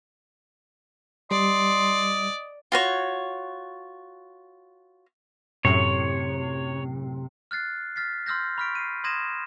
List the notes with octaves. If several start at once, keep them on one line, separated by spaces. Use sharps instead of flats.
G3 D5 D#5 C6
F4 F#4 C#5
F#2 A2 C3 C#5
F6 F#6 A6 C7
F6 A6 B6 C7
C6 E6 F6 G6 A#6
B5 C#6 F6 B6 D7
C7 D#7
C6 D#6 G#6 A#6 D#7 E7